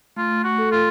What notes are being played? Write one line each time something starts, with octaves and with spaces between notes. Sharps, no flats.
A3 F4
F#4
A4
F4